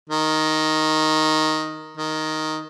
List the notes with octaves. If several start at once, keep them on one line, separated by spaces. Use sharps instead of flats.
D#3
D#3